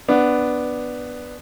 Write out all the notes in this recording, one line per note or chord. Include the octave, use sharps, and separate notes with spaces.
B3 D4